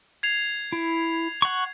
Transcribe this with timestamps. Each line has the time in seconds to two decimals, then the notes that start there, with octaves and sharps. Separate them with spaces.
0.23 G#6 C7 F7
0.72 E4
1.42 F#5 C#6